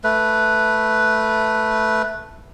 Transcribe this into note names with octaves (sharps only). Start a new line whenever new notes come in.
A3 B4